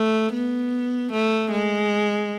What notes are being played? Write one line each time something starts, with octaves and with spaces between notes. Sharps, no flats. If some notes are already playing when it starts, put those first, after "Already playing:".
Already playing: A3
B3
A3
G#3